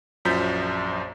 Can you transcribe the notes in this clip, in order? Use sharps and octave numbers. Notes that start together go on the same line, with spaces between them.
A#1 F#2 F3 G6 B6